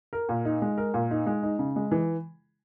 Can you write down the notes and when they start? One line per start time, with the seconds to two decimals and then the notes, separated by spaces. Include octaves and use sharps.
0.13 A#4
0.29 A#2
0.45 D#4
0.62 G#3
0.78 A#4
0.94 A#2
1.11 D#4
1.26 G#3
1.43 D#4
1.59 C#3
1.76 G#3
1.91 E3